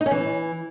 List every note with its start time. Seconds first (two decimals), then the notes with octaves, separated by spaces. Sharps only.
0.01 D#4
0.06 C#4
0.11 E3